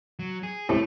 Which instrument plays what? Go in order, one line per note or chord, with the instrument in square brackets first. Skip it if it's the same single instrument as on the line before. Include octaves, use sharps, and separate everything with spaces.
[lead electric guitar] F#3
G#4
[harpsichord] A2 C3 [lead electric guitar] A3